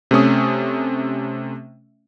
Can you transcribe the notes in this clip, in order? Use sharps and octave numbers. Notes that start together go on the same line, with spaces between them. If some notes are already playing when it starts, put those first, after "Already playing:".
C3 A3 C#4 D#6